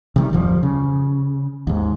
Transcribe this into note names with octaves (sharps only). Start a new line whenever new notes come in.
C3 D#3 G3
D1 F2 F3 G3
C#3
D#2 G#2